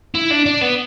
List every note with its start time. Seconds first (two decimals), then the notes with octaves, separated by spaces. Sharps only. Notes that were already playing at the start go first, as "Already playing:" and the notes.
0.15 E4
0.31 D4
0.46 D4
0.61 B3